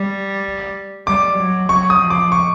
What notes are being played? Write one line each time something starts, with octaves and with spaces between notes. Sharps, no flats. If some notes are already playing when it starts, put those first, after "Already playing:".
Already playing: G3
G3 D6
F#3
F#3 C#6
D#6
F3
D6
C#6